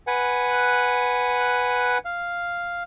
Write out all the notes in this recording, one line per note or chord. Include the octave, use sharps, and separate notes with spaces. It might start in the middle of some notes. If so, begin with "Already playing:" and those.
B4 F#5 G#5
F5